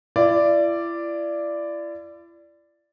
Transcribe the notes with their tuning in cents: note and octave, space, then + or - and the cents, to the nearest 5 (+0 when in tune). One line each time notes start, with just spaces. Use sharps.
E4 +40 D5 +0